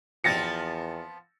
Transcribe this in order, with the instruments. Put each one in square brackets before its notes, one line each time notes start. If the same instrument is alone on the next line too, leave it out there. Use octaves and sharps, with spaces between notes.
[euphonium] E2 [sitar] F3 B3 C4 [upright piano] A6 A#6 C#7